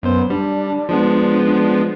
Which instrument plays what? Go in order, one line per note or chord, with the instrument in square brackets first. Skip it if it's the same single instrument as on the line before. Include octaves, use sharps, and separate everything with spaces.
[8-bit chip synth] F#2 C5 [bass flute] B3
[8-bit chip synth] G3 [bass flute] D4
[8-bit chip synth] F3 G#3 B3
[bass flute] D4